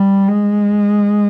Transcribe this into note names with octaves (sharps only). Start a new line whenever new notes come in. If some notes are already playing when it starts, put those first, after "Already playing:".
Already playing: G3
G#3